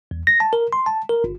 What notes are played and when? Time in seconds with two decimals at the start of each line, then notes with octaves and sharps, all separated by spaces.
0.11 E2
0.27 A#6
0.40 A5
0.53 A#4
0.73 C6
0.86 A5
1.09 A#4
1.24 G1